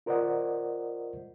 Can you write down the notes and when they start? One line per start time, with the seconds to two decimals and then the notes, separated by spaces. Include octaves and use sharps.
0.06 F4 A#4 C5 D5 D#5 F#5